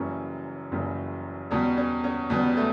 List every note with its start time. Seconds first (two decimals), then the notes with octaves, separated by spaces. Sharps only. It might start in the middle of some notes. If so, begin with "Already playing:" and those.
Already playing: F#1 F#2 C#3 E3 G3 C#4
0.71 F#1 F#2 C#3 E3 G3
1.51 E2 B2 G3 C#4
1.77 C#4
2.04 C#4
2.30 E2 B2 G3 B3
2.57 A3